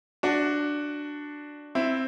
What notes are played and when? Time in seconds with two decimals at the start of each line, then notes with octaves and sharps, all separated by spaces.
0.23 D4 F#4
1.75 C4 E4